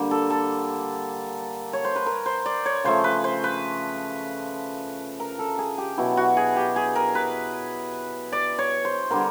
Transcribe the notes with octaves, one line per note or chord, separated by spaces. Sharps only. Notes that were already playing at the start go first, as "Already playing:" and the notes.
Already playing: D3 G3 A#3
A4
A4
C#5
C5
B4
A#4
C5
D5
C#5
C#3 F3 A3 C5
B4
C5
B4
A#4
A4
G#4
G4
B2 F#3 B3 E4
F#4
G#4
G4
G#4
A#4
B4
D5
C#5
C5
D3 G3 B3 A#4